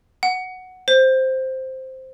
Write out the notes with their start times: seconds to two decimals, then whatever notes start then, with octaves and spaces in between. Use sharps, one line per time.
0.23 F#5
0.88 C5